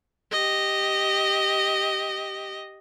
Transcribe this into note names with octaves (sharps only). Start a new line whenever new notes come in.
G4 D#5